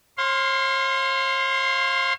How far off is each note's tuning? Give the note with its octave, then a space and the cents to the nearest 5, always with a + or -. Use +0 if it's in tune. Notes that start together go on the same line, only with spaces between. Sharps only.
C#5 -45 F5 +5 C6 +0